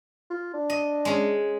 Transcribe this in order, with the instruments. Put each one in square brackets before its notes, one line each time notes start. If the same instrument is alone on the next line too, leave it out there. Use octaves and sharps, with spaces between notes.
[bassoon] F4
D4
[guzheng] D#5
G#3 C#4